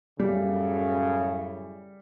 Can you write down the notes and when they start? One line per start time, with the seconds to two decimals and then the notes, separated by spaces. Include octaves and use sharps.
0.20 F#2 A2 C#3 G3